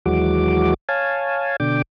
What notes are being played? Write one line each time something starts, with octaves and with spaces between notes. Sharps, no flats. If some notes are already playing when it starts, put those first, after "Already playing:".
D#2 E3 F#3 G#3 F#4 D6
C#5 F5 G#5 A5
B2 D3 D4 G5 D6